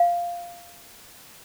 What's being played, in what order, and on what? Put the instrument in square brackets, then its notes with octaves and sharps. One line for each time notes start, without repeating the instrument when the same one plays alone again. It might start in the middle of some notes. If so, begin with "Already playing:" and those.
Already playing: [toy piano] F5